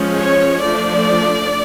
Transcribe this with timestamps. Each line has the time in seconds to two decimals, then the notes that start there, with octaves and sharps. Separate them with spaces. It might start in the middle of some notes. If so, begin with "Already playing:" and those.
Already playing: F3 G#3 C#4
0.17 C#5
0.62 F3 A3 D4 D5